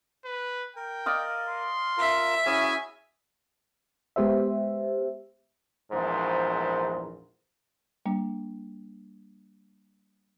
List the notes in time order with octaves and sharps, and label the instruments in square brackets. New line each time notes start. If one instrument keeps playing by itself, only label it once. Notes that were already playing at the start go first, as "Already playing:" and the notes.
[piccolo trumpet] B4
[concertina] A#4 [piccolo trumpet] G5
[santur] D5 D#5 F5
[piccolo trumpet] C6
[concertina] F4 A#4 [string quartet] E5
[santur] C#4 [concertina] E4 F#4 G#4 [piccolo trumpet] G#5
[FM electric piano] G#3 B3 G4 C5 E5
[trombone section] A#1 E2 G#2 A#4 C5
[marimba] G3 A#3 D4